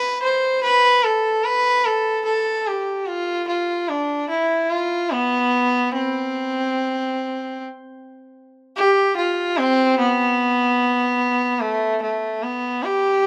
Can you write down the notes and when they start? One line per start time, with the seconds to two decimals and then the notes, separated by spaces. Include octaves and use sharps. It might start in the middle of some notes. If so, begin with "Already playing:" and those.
Already playing: B4
0.23 C5
0.63 B4
1.04 A4
1.45 B4
1.86 A4
2.26 A4
2.67 G4
3.08 F4
3.48 F4
3.89 D4
4.30 E4
4.70 F4
5.11 B3
5.92 C4
8.76 G4
9.17 F4
9.58 C4
9.99 B3
11.62 A3
12.03 A3
12.43 B3
12.83 G4